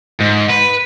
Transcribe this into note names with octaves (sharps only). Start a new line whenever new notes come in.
G#2
B4